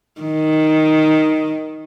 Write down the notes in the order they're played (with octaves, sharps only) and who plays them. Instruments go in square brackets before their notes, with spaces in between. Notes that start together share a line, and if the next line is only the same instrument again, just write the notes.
[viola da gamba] D#3